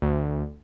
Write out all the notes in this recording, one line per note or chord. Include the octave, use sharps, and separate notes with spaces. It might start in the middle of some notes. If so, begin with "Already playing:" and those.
D2